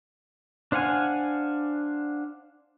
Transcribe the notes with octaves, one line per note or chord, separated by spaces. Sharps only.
D4 C5 F5 F#5 G#5